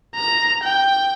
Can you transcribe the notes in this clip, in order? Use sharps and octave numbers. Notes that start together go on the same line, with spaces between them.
A#5
G5